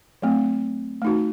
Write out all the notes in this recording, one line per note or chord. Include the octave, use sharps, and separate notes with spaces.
F#3 A3 C4
A3 D#4 F#4